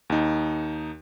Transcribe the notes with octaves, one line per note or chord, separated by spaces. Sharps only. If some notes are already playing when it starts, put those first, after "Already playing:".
D#2 D#4